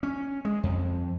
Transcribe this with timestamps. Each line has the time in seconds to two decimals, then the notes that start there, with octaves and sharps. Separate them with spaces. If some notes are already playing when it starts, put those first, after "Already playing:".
0.03 C#4
0.45 G#3
0.63 F2